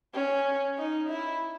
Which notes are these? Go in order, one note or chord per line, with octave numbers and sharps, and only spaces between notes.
C#4
D#4
E4